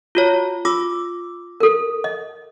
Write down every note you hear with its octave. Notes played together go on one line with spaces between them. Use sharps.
F4 F#4 C#5
F4 D6 E6
A4 A#4
D#5